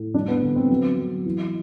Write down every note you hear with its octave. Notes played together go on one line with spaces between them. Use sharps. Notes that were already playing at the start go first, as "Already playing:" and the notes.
Already playing: A2
G3 D4
B3
D3 B3
C4
F#3
F#3
E3